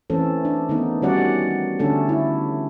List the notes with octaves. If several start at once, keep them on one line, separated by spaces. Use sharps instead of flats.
E3 A3 C4 C#4 A4
D4
D#3 A3 B3 D#4
D#3 G3 C#4 F#4 D5 F#5
D3 A3 C#4 D4 A4
E4